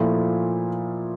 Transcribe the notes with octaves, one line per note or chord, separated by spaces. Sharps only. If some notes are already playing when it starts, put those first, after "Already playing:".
Already playing: A#2 F3 A3 E4